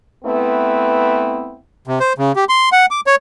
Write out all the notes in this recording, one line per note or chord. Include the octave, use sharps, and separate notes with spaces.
A3 B3 C4 E4 B4
C3
C5
C#3
G4
C6
F#5
D6
C#5